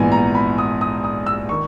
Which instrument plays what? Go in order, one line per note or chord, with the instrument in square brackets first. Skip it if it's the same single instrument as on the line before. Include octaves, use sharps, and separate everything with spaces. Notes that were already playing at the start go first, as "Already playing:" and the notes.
Already playing: [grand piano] A#1 G#2 E3 B3 F#5 G#5
A#5
B5
D#6
D#6
D#6
E6
D#3 C#6